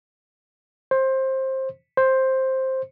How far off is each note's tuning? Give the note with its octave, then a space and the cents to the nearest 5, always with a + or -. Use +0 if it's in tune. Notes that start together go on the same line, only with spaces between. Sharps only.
C5 +20
C5 +10